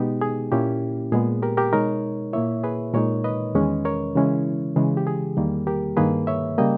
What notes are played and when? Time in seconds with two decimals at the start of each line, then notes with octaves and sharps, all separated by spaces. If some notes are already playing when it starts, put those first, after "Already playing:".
Already playing: B2 G#3 B3 D#4 G4
0.21 G#4
0.52 A#2 A#3 C#4 E4 G4
1.12 A#2 G#3 B3 G#4
1.42 G4 A#4
1.57 G4 A#4
1.73 B2 G#3 D#4 A#4 C#5
2.33 A#2 A#3 E4 C#5 E5
2.64 G#4 B4
2.94 A#2 G#3 D#4 A#4 C#5
3.24 B4 D#5
3.55 E2 D#3 G#3 C#4
3.85 A#4 C#5
4.15 C#3 E3 G#3 C#4 E4
4.76 C#3 E3 G#3 G#4
4.97 G4
5.07 G#4
5.37 E2 D#3 G3 A#3
5.67 G4 A#4
5.97 G2 D#3 A#3 G#4 B4
6.27 C#5 E5
6.58 C#3 G3 A#3 D#5 G5